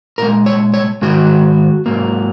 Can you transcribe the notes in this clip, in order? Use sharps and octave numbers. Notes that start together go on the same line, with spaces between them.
A#2 G#3 A#4
C#5
C#5
G#2 D#3 G#3 F#4
G#2 F#3 A#3